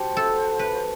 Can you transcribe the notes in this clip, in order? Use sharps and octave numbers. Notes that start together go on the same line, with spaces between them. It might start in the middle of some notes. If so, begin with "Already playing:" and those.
Already playing: F#4 G4 C5 F#5 A5
A4
B4